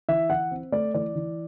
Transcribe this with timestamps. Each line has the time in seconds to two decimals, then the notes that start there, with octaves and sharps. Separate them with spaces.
0.08 E3 E5
0.30 E3 F#5
0.51 C4
0.72 A3 D5
0.94 E3 D5
1.15 E3